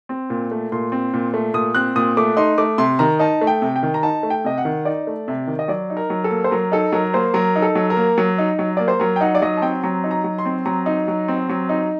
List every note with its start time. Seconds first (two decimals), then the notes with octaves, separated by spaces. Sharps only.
0.09 C4
0.30 A#2
0.51 A3
0.72 A#2 C6
0.92 C4
1.14 A#2
1.34 A3
1.54 A#2 D#6
1.74 C4 F#6
1.96 A#2 D#6
2.17 A3 D6
2.37 D#4 C6
2.58 A3 D6
2.78 C3 C6
2.99 D#3 A#5
3.20 D#4 A5
3.41 A3
3.47 G5
3.62 C3
3.76 G5
3.83 D#3
3.94 A#5
4.03 D#4 A5
4.23 A3
4.30 G5
4.44 C3 D#5
4.58 F#5
4.65 D#3
4.85 D#4 D5
5.07 A3
5.28 C3
5.47 D#3
5.59 D#5
5.68 F#3 D5
5.90 D#4
5.97 A#4
6.10 F#3
6.24 A4
6.30 A#3
6.44 C5
6.51 F#3 A#4
6.72 D#4 A4
6.92 F#3 A#4
7.13 A#3 C5
7.34 F#3 A#4
7.56 D#4
7.62 A4
7.75 F#3
7.90 A#4
7.97 A#3
8.18 F#3
8.38 D#4
8.59 F#3
8.77 A#3 D5
8.88 C5
9.00 F#3 A#4
9.16 G5
9.21 D#4 F#5
9.35 D5
9.42 F#3 D#5
9.57 A5
9.62 C4 G5
9.83 F#3 A#5
10.04 D#4
10.11 A#5
10.24 F#3
10.38 C6
10.46 C4
10.65 F#3 A#5
10.86 D#4
11.08 F#3
11.28 C4
11.49 F#3
11.69 D#4